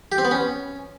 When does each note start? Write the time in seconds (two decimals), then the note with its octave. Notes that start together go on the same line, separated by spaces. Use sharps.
0.12 G4
0.18 C4
0.25 B3
0.31 C#4